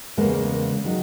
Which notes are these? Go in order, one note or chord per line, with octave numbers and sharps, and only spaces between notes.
E2 C#3 G#3 A#3
D#3 F#3